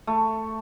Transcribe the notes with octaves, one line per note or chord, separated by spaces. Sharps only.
A3